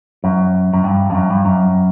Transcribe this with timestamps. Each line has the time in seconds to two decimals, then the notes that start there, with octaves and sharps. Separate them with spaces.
0.24 F#2
0.73 F#2
0.84 G2
1.10 F2
1.15 F#2
1.30 G2
1.45 F#2